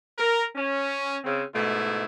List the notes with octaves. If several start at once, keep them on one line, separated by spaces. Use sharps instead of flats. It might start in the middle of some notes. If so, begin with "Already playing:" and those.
A#4
C#4
C#3 C4
G#2 B2 A3 E4